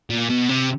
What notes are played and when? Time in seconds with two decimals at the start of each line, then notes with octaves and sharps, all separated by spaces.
0.10 A#2
0.30 B2
0.49 C3